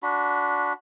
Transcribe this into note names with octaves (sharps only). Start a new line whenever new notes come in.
D4 F#4 B5